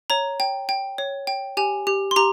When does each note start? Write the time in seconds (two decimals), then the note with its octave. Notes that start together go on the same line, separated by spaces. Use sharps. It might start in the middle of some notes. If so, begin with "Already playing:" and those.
0.10 C#5 A#5
0.40 G5
0.69 G5
0.98 C#5
1.27 G5
1.57 G4 G#5
1.87 G4
2.11 C6
2.16 G4 A#5